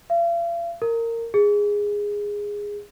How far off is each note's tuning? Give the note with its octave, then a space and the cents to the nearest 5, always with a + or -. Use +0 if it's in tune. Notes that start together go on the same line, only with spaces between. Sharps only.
F5 -45
A#4 -20
G#4 -10